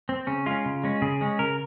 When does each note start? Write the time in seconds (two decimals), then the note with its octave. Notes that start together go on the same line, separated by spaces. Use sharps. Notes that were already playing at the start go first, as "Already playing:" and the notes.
0.09 C4
0.27 C#3 C#4
0.46 G#3 C#4 F4
0.66 C#3
0.84 G#3 C#4
1.02 C#3 G#4
1.21 G#3 C#4
1.39 C#3 A#4